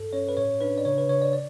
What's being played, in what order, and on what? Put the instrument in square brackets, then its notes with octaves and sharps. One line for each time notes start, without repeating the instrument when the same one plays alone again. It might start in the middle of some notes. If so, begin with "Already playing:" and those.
Already playing: [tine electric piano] G2 A4
C#4 C#5
B4
A2 C#5
D4 B4
D5
C#3 C#5
B4
C#3 C#5
D5
D5